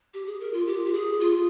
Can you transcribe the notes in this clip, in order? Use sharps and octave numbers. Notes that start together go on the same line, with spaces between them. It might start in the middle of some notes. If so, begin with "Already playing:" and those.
G4
G#4
A#4
F4
G4
G4
G#4
F4